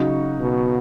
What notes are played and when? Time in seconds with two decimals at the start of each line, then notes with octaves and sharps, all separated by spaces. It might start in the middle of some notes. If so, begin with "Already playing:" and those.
Already playing: C#3 F#3 D#4 F#4
0.40 B2